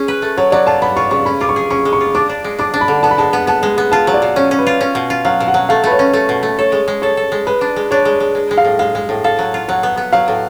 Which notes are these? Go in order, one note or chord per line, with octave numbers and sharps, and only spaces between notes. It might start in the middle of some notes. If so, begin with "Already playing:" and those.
Already playing: C#4 G#4
B4
A3
F#3 C#5
F#3 D5
F4 A5
B3 B5
F4 C#6
C#3 C#6
C#4 B5
F4 D6
C#6
G#4
C#4 C#6
G#3
C#6
F4
D4 D6
D4
G#3
D4 D6
D4
B5
D3
B3 A5
B5
G#3 A5
B3
B3 A5
G#3
B3
F4 A5
F#3
D5
B2
C#4 C#5
C#4
B4
F4
C#4
B2
F4
F#3 F5
B2
F#5
F#3
A3 F5
A3 B4
C#5
C#4
A3
B2
A3
A4 C#5
G#3
G#3
A4 C#5
A4
G#3
G#3 B4
D4
G#3
D4 C#5
G#3
G#3
G#3
G#3
F5
A2
G#3 F5
G#3
A2
A4 F5
F#3
F4
F#3 F#5
B3
B3
F#3 F5
A2